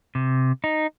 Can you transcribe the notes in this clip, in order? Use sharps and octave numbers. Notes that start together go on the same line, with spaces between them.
C3
D#4